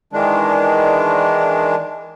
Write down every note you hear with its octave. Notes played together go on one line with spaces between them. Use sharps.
D#3 E3 G#3 D4